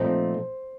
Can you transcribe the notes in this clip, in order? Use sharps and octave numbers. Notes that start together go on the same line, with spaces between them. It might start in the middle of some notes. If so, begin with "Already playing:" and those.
Already playing: A#2 F3 A3 C4 D#4 C5